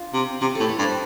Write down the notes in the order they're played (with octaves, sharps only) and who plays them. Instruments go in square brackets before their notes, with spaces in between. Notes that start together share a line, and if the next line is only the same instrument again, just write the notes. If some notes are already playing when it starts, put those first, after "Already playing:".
Already playing: [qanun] D4 F4
[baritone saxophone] C3
[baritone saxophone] C3 [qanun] G4
[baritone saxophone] A2 [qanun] A4
[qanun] B4
[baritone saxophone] G2
[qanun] C5